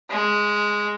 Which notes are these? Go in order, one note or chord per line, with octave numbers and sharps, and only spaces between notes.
G#3